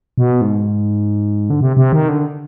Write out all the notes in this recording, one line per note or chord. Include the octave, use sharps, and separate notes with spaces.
B2
G#2
D3
C3
C3
D#3
D3